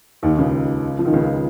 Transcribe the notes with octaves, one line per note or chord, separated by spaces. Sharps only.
D#2 D#3
C#2 C#3
F3
D#3
C#2 C#3